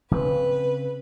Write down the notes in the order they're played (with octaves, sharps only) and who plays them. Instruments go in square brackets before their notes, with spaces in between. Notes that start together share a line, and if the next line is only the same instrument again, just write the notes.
[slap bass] C#3 C4 [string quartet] B4